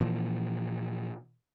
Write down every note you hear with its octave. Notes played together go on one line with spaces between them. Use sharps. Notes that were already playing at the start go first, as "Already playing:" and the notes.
A#2 E3 F3